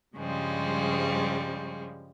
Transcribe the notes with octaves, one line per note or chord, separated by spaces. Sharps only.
G2 C#3 F3 G3 G#3